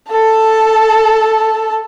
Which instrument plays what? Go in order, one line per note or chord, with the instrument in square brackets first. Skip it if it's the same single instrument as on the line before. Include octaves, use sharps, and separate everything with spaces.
[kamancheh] A4 A5